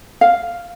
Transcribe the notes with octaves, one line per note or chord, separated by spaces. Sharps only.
F5